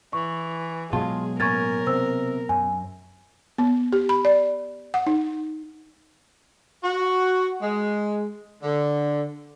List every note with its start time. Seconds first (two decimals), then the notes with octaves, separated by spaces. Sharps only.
0.13 E3 C#6
0.93 B2 F#3 G#3 F4 G#4 A5
1.40 A2 A#3 C#4 A#4 C#6 G#6 A6
1.87 C3 C5 E6
2.49 F#2 G#5
3.58 B3
3.93 G4
4.09 B5
4.25 D5
4.94 F#5
5.07 D#4
6.84 F#4
7.61 G#3
8.63 D3